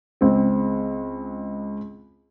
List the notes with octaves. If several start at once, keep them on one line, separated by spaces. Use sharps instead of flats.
C#2 C4